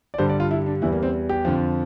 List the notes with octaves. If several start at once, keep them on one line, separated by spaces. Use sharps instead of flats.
D5
G2 D3 G3 C5
D5
F4
E4
D4
E2 E3 G3 E4
A#3
C4
G4
F2 D3 F3